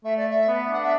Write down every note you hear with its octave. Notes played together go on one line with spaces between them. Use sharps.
A3 E5
D5
E5
B3
D4 F#5
E5